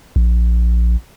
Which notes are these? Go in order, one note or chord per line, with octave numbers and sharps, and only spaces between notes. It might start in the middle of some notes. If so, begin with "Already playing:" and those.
A#1